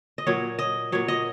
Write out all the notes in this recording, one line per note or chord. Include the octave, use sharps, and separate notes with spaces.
D#5
A#2 F#3 C#5
D#5
A#2 F#3 C#5
D#5